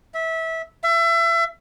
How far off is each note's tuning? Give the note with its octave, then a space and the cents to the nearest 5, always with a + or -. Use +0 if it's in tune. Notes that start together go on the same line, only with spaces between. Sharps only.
E5 -20
E5 +30